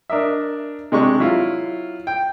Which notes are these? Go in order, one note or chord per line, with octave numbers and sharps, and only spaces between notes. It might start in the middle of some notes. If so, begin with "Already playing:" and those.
D4 A#4 D#5 E5
C3 G#3 D4 C#6
F#3 E4 F4
G5